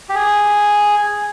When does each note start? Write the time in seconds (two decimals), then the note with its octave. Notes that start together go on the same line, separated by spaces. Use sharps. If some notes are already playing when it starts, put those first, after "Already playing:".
0.09 G4
0.15 G#4